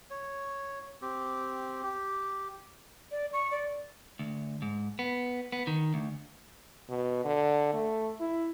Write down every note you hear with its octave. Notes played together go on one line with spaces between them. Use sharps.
C#5
C4 G4
G4
D5
C#6
D5
D2
G#2
B3
B3
D#3
D2
B2
D3
A3
E4